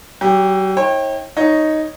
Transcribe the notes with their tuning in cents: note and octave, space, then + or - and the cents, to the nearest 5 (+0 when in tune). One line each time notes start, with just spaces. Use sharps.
F#3 +45 G4 +20
D#4 +45 C#5 -35 G5 +0
D#4 +0 C#5 +0